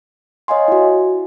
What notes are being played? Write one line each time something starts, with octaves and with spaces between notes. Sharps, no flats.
C#5 D#5 F5 G#5 C6
E4 F#4